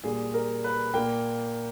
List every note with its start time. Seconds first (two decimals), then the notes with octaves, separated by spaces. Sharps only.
0.04 A#2 G3 A#3 G#4
0.34 A#4
0.64 B4
0.94 A#2 A#3 G5